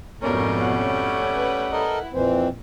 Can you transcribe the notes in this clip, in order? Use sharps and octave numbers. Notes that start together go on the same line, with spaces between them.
F2 G#2 B2 G3 A3 C#4 A#4
F#5
B4
E4 A4 A#4 D#5
A#1 F2 E3 C4